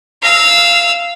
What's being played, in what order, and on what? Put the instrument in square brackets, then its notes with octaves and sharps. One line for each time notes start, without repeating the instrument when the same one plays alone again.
[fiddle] F5 E6